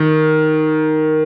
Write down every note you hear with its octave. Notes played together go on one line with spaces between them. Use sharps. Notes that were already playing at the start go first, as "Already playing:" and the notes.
Already playing: D#3